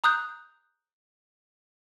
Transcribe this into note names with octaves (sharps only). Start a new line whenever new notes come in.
A#5 D#6 F#6 G6